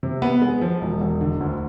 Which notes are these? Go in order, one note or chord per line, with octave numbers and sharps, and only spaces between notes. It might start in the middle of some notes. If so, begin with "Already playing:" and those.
C3
B3
G#3
F3
E1
E1
D3
D2